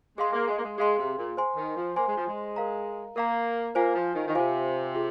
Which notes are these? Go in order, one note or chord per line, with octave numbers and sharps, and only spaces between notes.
G#3 G#4 F5 C6
A#3
G#3
A#3
G#3
G#3 G#4 F5 C6
C3
A#2
C5 G#5 C6
D#3
F3
A#3 C5 G#5 C6
G#3
F3
G#3
A#4 F5 A#5
A#3 A#4 F5 A#5
A#3 F4 C5 F5 G#5
F3
D#3
D#3
C3 F4 C5 F5 G#5
F4 G#4